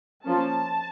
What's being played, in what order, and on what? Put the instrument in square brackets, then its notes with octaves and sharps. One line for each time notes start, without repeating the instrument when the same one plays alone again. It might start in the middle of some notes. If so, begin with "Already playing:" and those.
[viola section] F3 A#3 C#4 A5